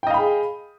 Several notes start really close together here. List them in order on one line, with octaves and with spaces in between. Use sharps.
G5 D#5 F5 B5 G#4